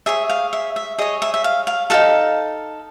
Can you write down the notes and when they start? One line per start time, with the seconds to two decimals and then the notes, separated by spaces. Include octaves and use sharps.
0.06 G#4 C#5 E5
0.29 F5
0.53 E5
0.76 E5
0.98 G#4 C#5 D#5
1.22 E5
1.34 E5
1.44 F5
1.67 F5
1.90 D#4 F#4 A4 F5